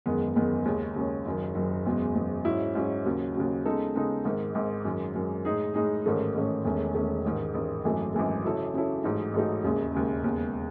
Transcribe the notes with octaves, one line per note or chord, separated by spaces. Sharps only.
F#1 E2 D#3 G#3 B3
F#1 E2 D#3 G#3 B3
D#2 C#3 G#3 C#4
D#2 C#3 G#3 C#4
F#1 F#2 D#3
F#1 F#2 D#3
F#1 E2 B2 G#3
F#1 E2 B2 G#3
G#2 F#3 C#4 E4
G#2 F#3 C#4 E4
D#2 C#3 F#3
D#2 C#3 F#3
C#3 G#3 B3 D#4 A4
C#3 G#3 B3 D#4 A4
G#1 G#2 D#3
G#1 G#2 D#3
F#2 D#3 G#3
F#2 D#3 G#3
A2 G#3 D#4 G#4
A2 G#3 D#4 G#4
A1 G#2 D#3 A3 C#4
A1 G#2 D#3 A3 C#4
E1 E2 D#3 A3 C#4
E1 E2 D#3 A3 C#4
A1 G#2 D#3
A1 G#2 D#3
G#1 F#2 E3 A3
G#1 F#2 E3 A3
C#3 F#3 C#4 E4 A4
C#3 F#3 C#4 E4 A4
A1 G#2 F#3 A3 D#4
A1 G#2 F#3 A3 D#4
E1 D#2 C#3 G#3
E1 D#2 C#3 G#3
E1 D#2 C#3 G#3 B3